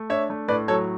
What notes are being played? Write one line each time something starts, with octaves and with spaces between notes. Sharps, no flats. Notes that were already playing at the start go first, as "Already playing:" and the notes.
Already playing: A3
D4 C#5 E5
A3
A2 B4 D5
F#3 A4 C#5